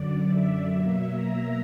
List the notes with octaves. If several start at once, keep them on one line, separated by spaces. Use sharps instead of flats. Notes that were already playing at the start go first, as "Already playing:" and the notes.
Already playing: F#2 D3 F#3 D5
E5
B2 F#3 A#3 E5
A#5